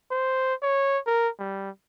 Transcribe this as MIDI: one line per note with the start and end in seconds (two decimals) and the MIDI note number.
0.11 0.54 72
0.63 0.98 73
1.07 1.28 70
1.39 1.70 55